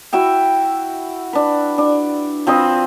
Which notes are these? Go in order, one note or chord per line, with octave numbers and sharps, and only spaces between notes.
E4 F#4 E5 G5
D4 B4
D4
F3 C4 B4 D#5